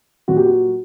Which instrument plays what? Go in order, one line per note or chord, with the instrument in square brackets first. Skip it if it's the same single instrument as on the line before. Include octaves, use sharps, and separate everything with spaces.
[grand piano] A#2 F#3 F#4
G4
F#4